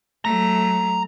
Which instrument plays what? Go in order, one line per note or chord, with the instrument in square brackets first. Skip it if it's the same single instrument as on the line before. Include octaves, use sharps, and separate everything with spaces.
[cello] F#3 A3 [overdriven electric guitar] A#5